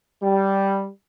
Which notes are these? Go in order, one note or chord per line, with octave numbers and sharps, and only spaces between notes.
G3